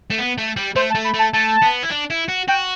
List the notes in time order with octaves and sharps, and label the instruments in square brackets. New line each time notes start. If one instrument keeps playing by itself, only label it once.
[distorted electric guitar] A3
B3
A3
G3
[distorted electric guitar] A3 [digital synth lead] C5
[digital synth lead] A5
[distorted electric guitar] A3
[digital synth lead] B5
[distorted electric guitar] A3
[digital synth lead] A5
[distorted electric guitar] A3 [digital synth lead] A5
[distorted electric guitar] B3
E4
D4
E4
F#4
[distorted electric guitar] F#4 [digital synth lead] G5